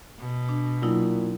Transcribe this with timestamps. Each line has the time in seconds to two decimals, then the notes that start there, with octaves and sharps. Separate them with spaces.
0.19 B2
0.49 D4
0.82 A#2 F#3 D#4 E4